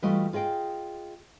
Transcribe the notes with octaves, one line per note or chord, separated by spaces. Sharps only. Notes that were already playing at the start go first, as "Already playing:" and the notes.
E3 G3 A3 F4 F#4 D#5
F4 G#4 D#5 G5